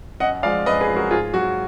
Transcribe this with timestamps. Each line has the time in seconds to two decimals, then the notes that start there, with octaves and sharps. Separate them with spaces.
0.20 F#2 D#5 F#5
0.43 F3 G#3 D5 F5
0.66 F#2 B4 D#5
0.81 G#4 B4
0.88 F3 G#3
0.96 F#4 A#4
1.10 G#2 F4 G#4
1.34 F#3 F#4